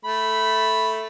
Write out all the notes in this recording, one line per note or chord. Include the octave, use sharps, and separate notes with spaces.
A3 B5